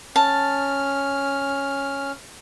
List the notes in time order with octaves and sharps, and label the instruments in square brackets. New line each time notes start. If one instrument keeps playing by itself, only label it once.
[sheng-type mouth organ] C#4 F6 [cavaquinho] A5